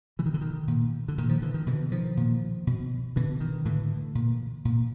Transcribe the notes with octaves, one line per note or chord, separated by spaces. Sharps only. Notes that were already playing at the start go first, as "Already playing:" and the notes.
B2 E3
D#3
D3
D#3
A#2
D3
A#2 D#3
D#3 F3
D3 E3
D#3
B2 D3 E3
D#3 F3
A#2
B2
B2 D3 E3
D#3
A2 D3 E3
A#2
A#2